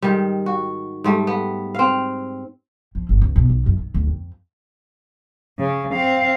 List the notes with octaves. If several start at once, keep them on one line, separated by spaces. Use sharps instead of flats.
G#2 D#3 G3
F#4
G#2 G3 A3
B3
C4 F5
F3
G1
C#2
B2
B1
F#2
D#3
D2
F2
C#3
C4 F5